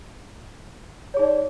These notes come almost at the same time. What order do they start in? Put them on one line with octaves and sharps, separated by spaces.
C#5 G#4 D#4 D5